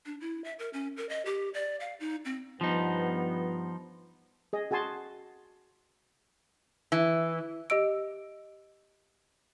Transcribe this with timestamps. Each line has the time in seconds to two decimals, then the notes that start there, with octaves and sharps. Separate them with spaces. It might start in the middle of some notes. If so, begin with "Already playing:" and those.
0.06 D4
0.21 E4
0.44 E5
0.59 A#4
0.73 C#4
0.97 A#4
1.09 D#5
1.25 G4
1.54 D5
1.80 F5
2.00 D#4
2.25 C4
2.61 G2 F3 B3 D#4
4.53 G#4 D#5
4.71 F#4 G#4 G#5 A5 C6
6.92 E3
7.70 G4 D#5 E6 D7